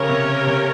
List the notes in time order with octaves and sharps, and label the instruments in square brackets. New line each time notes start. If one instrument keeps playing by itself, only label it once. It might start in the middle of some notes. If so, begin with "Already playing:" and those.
Already playing: [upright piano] C#3 [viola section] C#4 G4 A#4 C#5
[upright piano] C3
C#3
C3